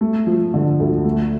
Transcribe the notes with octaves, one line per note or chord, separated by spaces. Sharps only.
A3
F3
D3
D2
A3